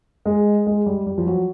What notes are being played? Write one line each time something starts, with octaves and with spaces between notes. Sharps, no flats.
G#3
G#3
G3
G3
F3
F#3